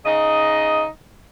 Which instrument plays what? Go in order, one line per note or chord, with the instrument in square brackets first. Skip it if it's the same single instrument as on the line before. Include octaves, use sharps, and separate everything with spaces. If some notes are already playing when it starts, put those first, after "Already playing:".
[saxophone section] C#3 D#4 D#5